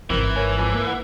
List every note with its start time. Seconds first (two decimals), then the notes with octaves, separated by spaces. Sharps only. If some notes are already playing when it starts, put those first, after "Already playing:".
0.10 G#1 G#2 E3 C4 E4 A#4
0.36 A#4 C#5 G#5
0.58 F2 G#5 D6
0.74 A#3
0.87 F#5